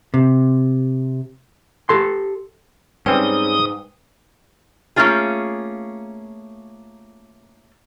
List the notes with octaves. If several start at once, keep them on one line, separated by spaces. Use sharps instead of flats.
C3
G4 A4 C6
G#2 G3 C4 C#4 B4 G5 G#5 D#6
A3 A#3 C#4 F4 G#4